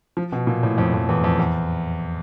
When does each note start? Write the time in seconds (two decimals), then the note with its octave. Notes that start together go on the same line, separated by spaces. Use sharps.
0.17 F3
0.32 B2
0.47 A#2
0.63 A2
0.78 F2
0.94 F2
1.09 E2
1.24 F2
1.39 E2